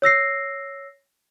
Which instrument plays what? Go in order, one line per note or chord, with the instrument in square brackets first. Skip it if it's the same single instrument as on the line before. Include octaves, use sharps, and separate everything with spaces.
[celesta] C#5 E6 A#6 C7